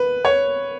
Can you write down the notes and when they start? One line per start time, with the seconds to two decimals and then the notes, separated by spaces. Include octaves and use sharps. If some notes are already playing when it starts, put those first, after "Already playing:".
Already playing: B4
0.25 C#5